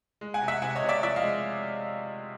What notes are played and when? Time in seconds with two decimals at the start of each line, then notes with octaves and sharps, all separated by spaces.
0.21 G#3
0.34 F#5 G#5
0.41 C3
0.48 E5 F#5
0.62 C3 F#5 G#5
0.75 C#5 D#5
0.82 C3
0.89 D5 E5
1.03 F3 D5 E5
1.16 D#5 F5
1.23 G#3